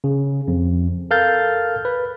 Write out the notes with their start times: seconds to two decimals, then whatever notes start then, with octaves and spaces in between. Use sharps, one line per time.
0.04 C#3
0.48 F2
1.11 A4 A#4 F5 F6 G6 A6
1.85 B4